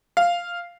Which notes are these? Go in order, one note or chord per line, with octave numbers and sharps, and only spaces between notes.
F5